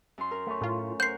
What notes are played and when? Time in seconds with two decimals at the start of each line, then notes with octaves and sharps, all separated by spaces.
0.18 F#2 C6
0.31 A#4
0.47 A3 C#4 C#5
0.61 A2 F4
1.00 A#4 C5 F#5 G6 C7